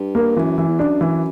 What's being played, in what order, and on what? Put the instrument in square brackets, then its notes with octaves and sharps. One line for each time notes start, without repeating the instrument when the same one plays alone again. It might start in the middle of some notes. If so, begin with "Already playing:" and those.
Already playing: [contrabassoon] G2
[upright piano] A#3
[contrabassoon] F#2 [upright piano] E3
[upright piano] E3
[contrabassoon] E2
[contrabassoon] F#2 [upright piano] D4
[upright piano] E3